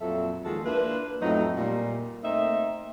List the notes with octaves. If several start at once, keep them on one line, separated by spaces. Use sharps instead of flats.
F2 A#2 F3 F#3 A4 E5
D#2 F3 G#3 F#4 G#4 A4
A#3 D4 E4 F4 B4
F2 A2 F3 F#3 A3 D#4
A#2 G3
A3 A#3 C4 D#4 E5